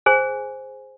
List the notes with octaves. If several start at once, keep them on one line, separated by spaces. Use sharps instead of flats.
G#4 C5 G#5